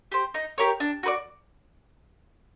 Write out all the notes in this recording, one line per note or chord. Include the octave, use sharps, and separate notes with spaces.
G4 C5
D#4
G4 A#4 C#5
D4
F#4 B4 D5